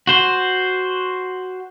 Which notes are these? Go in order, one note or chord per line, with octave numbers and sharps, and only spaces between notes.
F#4 C5